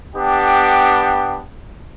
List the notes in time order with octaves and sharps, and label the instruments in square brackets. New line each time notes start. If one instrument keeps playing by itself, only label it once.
[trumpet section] B3 D4 G4 G5